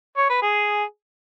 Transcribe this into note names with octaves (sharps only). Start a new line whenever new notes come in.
C#5
B4
G#4